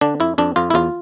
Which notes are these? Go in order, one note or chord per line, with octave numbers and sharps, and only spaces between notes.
D3 D4
F2 E4
F2 D4
F2 F4
E4
E2 F4